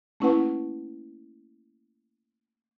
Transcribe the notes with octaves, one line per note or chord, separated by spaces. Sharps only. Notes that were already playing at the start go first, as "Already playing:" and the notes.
A3 A#3 C#4 E4 B4 F#5